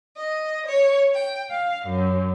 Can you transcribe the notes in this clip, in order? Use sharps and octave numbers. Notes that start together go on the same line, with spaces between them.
D#5
C#5
G5
F5
F#2